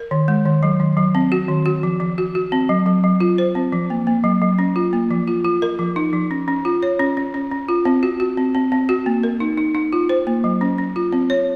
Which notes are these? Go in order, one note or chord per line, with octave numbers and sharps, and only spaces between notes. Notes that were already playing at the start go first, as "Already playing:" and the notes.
Already playing: A#4
D#3
G#3
D#3
F#3
D#3
F#3
C4
F#4
D#3
F#4
F3
F3
F#4
F#4
C4
F#3
F#3
F#3
F4
C5
C4
F3
A#3
A#3
F#3
F#3
C#4
F4
A#3
F3
F4
F4
A#4
F3
D#4
F3
C#4
C#4
F4
C#5
C#4
C#4
C#4
C#4
F4
C4
F#4
F#4
C4
C4
C4
F#4
A#3
A#4
D#4
D#4
D#4
F4
C5
A#3
F#3
C#4
C#4
F4
C4
C#5